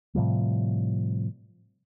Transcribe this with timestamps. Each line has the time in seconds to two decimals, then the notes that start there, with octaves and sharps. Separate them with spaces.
0.15 A2 C3 F3 G3